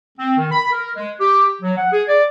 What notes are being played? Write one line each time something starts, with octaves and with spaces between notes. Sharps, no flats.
C4
D#3
B5
A#4
G#3
G4
F#3
F#5
G#4
D5